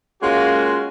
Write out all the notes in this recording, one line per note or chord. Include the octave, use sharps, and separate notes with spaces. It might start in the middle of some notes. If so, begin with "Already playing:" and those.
G#3 A#3 C#4 F4 F#4